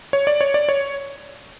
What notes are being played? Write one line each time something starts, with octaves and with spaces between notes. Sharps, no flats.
C#5
D5
C#5
D5
C#5